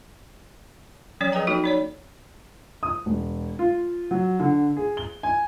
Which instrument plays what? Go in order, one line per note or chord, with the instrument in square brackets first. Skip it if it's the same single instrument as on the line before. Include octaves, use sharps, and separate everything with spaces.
[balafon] F3 F#3 C#4 C#5 D5
F3 G#4 B4 D#5 G5 A#5
F3 A#3 D#4 F#4 A4 G5
D#4 C#5 D5
[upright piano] D#6
E1
F4
F#3
D3
G#4
G7
G#5